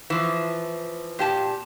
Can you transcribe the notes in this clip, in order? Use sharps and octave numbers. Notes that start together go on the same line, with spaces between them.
E3 F3
A#2 G4 A5